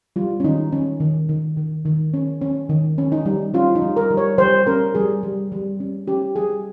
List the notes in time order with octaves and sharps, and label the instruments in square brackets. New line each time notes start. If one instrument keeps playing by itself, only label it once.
[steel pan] G3 F4
C#4
D#3 D#4
D#3 C#4
D#3
D#3
D#3
D#3
C#4
C#4
D#3
C#4
D#4
G3
C#4 F4
D#4
G3
A#4
G3
C#5
G3 C5
C#4 A#4
G3 G#4
G3
G3
C#4
C#4 G4
G3 G#4